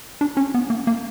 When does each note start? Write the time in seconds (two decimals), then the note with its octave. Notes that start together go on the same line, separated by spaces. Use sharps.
0.21 D4
0.37 C#4
0.54 B3
0.70 A#3
0.87 A#3